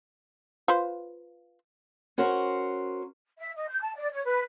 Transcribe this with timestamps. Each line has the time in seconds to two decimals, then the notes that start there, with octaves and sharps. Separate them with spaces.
0.68 F4 B4 C5
2.18 C#4 F#4 A#4 C5
3.38 E5
3.55 D#5
3.68 G6
3.81 A5
3.95 D5
4.11 C#5
4.24 B4